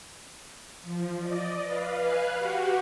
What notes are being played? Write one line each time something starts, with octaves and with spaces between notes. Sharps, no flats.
F3
D5 D#5
B4 F5
B4 F5 G#5 F#6
F#4 G4 F#5